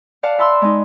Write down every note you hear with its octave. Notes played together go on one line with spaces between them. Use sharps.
D5 F5 F#5 A5
E5 A5 B5 C6 E6
G#3 D#4